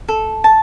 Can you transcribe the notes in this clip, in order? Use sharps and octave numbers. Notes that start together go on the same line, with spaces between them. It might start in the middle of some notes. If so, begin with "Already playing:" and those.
A4
A5